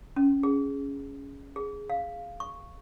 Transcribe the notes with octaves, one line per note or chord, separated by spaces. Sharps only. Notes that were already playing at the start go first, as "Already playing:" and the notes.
C#4
G#4
G#4
F5
C#6